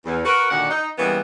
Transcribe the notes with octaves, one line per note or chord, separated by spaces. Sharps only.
E2
F#4 A#4 B4
A#2 D3 D#3 F#4 D5 F#5
D#4
C#3 E3 G3 G#3 A#3 B3